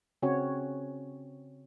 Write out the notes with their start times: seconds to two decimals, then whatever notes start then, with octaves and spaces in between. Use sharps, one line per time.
0.22 C#3 C4 C#4 F#4 C#5